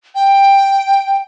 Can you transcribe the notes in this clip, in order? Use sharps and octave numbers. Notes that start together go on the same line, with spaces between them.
G5